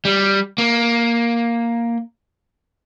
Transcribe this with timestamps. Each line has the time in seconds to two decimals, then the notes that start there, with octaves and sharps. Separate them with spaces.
0.05 G3
0.58 A#3